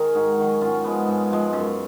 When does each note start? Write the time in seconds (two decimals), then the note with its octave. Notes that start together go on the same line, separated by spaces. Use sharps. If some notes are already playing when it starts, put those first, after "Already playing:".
Already playing: D#3 G#4 A#4 C#5
0.15 G#2 D#4 F#4
0.38 D#3 F#3
0.61 G#2 C#4 F4
0.84 F3 G#3 B3
1.08 G#2
1.31 F3 G#3
1.53 F#2